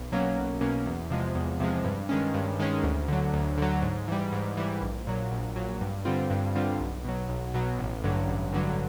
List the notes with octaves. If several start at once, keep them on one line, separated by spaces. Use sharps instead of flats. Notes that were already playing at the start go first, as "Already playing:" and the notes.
Already playing: B1
B2 F#3 A#3 C#4
B1
B2 F#3 A#3 C#4
E2
C3 F3 G#3
E2
C3 F3 G#3
G2
D#3 G#3 C#4
G2
D#3 G#3 C#4
D2
D3 F#3
D2
D3 F#3
G#2
E3 G3
G#2
E3 G3
A#1
A#2 F#3
A#1
A#2 F#3
G2
D3 G3 C4 F4
G2
D3 G3 C4 F4
B1
B2 F#3
B1
B2 F#3
A1
G2 D3 F#3
A1
G2 D3 F#3